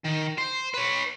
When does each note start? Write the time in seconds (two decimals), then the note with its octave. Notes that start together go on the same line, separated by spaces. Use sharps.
0.05 D#3
0.38 C5
0.74 B4 C#5